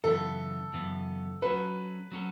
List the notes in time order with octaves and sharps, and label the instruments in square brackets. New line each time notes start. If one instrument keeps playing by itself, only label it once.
[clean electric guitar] F#2 C#3 E3 B3 [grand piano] A4
[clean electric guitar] F#2 C#3 E3 B3
[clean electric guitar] F#3 C#4 F#4 A4 [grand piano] B4
[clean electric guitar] F#3 C#4 F#4 A4